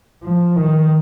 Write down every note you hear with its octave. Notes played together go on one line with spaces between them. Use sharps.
F3
D#3